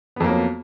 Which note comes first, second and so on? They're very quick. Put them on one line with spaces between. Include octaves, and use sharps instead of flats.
B3 F2 A#3 F#3